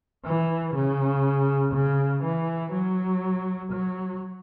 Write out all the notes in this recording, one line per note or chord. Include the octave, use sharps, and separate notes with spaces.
E3
C#3
C#3
E3
F#3
F#3